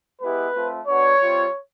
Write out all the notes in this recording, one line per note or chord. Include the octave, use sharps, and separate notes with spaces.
G#3 B3 E4 G4 B4
A3 C4 F4
B3 D4 F#4 C#5
G3 C4 F4